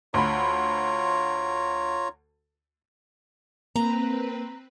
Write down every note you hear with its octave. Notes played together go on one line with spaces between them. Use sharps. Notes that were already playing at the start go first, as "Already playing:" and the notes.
D2 F4 C#5 A#5 B5
A#3 C4 B4 A#5